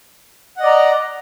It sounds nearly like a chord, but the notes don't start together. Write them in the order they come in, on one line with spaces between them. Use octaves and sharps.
F#5 D#5 D5 A#5